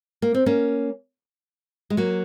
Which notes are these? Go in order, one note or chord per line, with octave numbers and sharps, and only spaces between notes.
A#3
C4
A#3 C#4
G#3
F#3 A#3